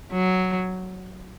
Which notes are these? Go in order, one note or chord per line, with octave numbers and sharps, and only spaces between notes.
F#3